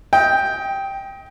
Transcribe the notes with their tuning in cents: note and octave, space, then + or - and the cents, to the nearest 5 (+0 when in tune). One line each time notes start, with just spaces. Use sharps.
D#5 +30 G5 +0